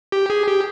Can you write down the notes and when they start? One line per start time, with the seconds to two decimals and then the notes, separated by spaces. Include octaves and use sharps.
0.12 G4
0.30 G#4
0.47 G4